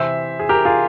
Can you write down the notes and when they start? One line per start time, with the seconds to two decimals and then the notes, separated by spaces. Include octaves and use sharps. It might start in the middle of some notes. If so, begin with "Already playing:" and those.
Already playing: C3 E3 C5 E5
0.39 G#4
0.49 G4 A#4
0.65 F4 G#4